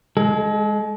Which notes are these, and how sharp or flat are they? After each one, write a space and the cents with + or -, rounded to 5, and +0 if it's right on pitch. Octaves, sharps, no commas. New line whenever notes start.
G#3 +0 A4 -40